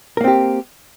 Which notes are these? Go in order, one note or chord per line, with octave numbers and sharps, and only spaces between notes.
A#3 C4 G4 A#4